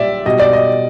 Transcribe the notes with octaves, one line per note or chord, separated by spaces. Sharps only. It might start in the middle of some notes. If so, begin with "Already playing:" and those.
Already playing: A#2 G3 D5 E5
B2 G3 D#5
D5
D#5